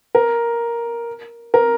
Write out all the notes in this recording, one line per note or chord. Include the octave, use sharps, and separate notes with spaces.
A#4
A#4